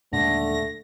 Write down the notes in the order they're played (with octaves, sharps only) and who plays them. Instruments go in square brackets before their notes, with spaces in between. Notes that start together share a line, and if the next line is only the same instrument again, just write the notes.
[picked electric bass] D#2 A#2 G#3 [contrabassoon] D3 [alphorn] A3 [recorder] A#6